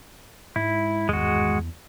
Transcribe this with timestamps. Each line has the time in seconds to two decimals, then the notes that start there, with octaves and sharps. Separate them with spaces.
0.56 G#2 G#3 E4
1.09 G#1 E2 G2 G#3 F#4